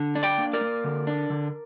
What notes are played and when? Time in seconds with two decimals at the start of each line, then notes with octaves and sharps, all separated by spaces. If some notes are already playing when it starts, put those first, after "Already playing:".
Already playing: D3
0.15 D4
0.23 D5 G5
0.38 A#3
0.53 A#4 D5
0.61 A#3
0.84 D3
1.07 D4
1.30 D3